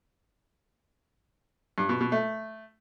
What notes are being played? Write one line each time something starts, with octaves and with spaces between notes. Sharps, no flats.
G2
B2
B2
A3